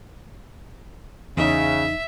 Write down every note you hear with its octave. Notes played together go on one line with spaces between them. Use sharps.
E2 C#3 D#4 E5